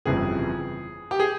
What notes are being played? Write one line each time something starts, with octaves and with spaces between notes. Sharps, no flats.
G1 F2 C#3 E3 G3 G#4
G4
G#4